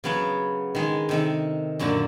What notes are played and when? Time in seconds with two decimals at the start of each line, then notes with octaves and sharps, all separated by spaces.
0.04 C#3 F#3 B3 C#5 A5
0.75 D#3 G#3 G#4
1.09 C3 D#3 A4
1.79 F#2 A#2 D3 F#4 A5